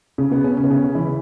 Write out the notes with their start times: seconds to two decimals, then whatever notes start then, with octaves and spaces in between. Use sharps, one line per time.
0.18 C#3 C#4
0.31 B2 B3
0.44 C#3 C#4
0.57 C#4
0.64 B3
0.71 C#3 C#4
0.94 E3 E4